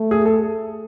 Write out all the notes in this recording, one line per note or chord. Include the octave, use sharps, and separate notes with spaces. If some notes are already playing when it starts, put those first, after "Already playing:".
Already playing: A3
G#4
A4